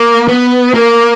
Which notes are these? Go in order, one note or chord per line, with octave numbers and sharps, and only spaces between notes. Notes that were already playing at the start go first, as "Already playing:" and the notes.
Already playing: A#3
B3
A#3